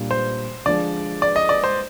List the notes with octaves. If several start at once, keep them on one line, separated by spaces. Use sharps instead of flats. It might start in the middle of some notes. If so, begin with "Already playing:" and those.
Already playing: A#2 G3 D4
C5
D3 F3 G#3 D5
D5
D#5
D5
C5